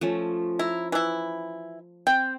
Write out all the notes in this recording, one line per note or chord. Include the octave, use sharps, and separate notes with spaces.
F3 A3 C#4
E4 A#5
E3 E4
C4 G5